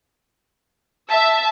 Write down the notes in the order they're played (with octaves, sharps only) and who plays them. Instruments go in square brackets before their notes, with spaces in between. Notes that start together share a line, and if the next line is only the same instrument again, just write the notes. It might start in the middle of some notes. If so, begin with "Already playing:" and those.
[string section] E5 [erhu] A5